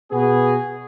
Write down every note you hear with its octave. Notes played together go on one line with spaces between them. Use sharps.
B2 B3 F#4 G#4